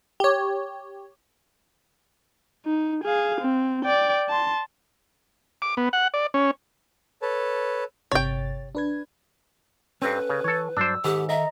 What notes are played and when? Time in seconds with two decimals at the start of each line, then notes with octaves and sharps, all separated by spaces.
0.20 G4 C#5
2.66 D#4
3.04 G#4 F5
3.41 C4
3.84 D5 G5
4.29 A5 C6
5.62 D6
5.77 B3
5.93 F#5
6.14 D5
6.34 C#4
7.22 A4 B4 C#5 A5
8.12 G1 C3 C#5 G5 A6
8.75 D4 B4 G#6
10.02 G2 C4 C#4 A4 B4
10.30 C#3
10.44 E3 A4 C#5
10.77 G2 F#3 D4 C5 D5 E6
11.04 G#2 D#3 G4 A4 F#5
11.29 D#5 E5 A#5